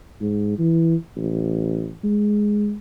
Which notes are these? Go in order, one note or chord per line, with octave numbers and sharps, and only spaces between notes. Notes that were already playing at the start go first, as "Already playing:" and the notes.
G#2
E3
A1
G#3